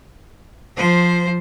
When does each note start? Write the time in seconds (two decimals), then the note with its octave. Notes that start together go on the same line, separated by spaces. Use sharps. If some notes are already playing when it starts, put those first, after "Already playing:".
0.76 F3 C5